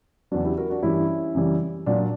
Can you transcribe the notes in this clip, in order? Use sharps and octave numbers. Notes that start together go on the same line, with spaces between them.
E2 C#3 F#3 D4 F#4
E4 G4
F#4 A#4
D4 F#4
G2 E3 G3 C#4 E4
F#2 C#3 E3 G3
A#2 F#3 D4